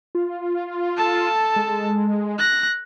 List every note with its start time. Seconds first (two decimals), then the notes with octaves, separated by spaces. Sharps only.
0.15 F4
0.97 A4 A5
1.56 G#3
2.38 F#6 A#6